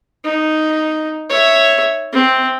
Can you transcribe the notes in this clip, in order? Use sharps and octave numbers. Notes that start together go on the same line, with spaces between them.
D#4
C#5 E5
C4